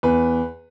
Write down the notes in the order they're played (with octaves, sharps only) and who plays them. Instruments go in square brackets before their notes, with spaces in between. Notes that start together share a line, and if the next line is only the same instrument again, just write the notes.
[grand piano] E2 B4